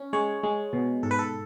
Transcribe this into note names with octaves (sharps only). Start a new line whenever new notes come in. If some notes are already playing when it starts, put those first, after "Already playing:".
Already playing: C#4
G#3 C#5
G#3
B2
G#2 A4
B4
A4